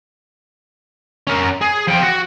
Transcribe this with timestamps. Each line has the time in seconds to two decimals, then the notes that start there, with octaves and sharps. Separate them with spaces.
1.27 C#4 A#4
1.61 G#4
1.87 F3 G5
2.02 F#4